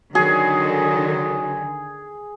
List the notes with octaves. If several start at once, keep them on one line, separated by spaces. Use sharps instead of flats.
D3 D#3 F#3 G#4